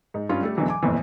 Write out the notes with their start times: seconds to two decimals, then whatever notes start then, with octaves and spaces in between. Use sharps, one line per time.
0.14 G#2
0.29 G2 C#4 F4
0.41 G3 A3 A4
0.57 E2 B2 D3 E3 F#3
0.68 G#5 D6
0.83 G1 F2 A#2 E3